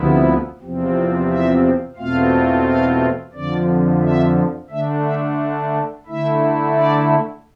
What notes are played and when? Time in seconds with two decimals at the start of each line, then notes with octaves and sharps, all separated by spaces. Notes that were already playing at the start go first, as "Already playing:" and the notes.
Already playing: D2 C3 F3 B3 E4
0.60 E2 C3 F3 C4
1.29 E5
1.96 E2 B2 A3 C4 F4 F5
2.65 F5
3.33 F2 D3 F3 D5
4.01 E5
4.69 D3 A3 D4 E5
5.04 E5
6.06 D3 A3 E4 E5
6.74 D5